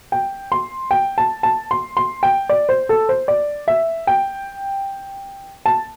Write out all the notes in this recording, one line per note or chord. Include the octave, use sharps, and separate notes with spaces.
G5
C6
G5
A5
A5
C6
C6
G5
D5
C5
A4
C5
D5
E5
G5
A5